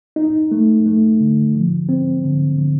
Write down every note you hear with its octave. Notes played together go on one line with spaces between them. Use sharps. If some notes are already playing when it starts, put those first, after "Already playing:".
D#4
A3
A3
D3
F3
C4
D3
D3